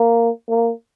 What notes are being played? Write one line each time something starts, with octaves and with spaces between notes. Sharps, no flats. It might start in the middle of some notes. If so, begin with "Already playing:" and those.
Already playing: A#3
A#3